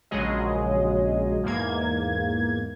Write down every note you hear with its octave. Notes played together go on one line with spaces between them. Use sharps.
A#1 C#3 F#3 G#3 G#4 D#5
E2 G#2 A#3 G#6